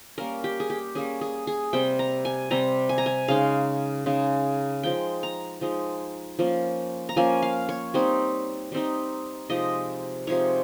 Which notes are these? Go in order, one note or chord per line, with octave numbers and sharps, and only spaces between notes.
G3 A#3 C#4 A#4
G4
G#4
G4
G3 A#3 C#4 G#4
G#4
G#4
C3 G3 C4 G5
A#5
G#5
C3 G3 C4 A#5
G#5
A#5
G#5
C#3 G#3 D#4 F5
C#3 G#3 D#4
F3 G#3 D#4 G5
A#5
F3 G#3 D#4
F3 A#3 C#4
A#5
F3 A#3 C#4 G#5
F5
C#5
G3 C4 D#4
G3 C4 D#4
C3 F3 G#3 D#4 D#5
C3 F3 G#3 D#4 C#5